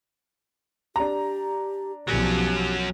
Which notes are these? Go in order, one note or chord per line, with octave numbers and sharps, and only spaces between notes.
D4 G4 A#5
B1 F3 F#3 C#4 G4